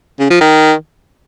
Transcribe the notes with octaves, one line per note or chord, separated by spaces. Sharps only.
C#3
F3
D#3